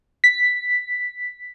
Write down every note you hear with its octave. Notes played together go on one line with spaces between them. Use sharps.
B6